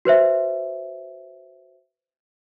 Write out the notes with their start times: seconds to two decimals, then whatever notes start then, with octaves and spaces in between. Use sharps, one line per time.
0.05 F#4 B4 C5 E5